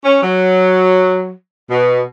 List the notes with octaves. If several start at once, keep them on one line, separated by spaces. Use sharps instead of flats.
C#4
F#3
B2